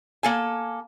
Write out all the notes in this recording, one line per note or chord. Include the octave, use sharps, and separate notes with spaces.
A#3 A4 G#5